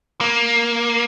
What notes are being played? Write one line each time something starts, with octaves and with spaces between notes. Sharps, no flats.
A#3